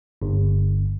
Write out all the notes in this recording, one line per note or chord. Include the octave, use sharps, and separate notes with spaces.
G1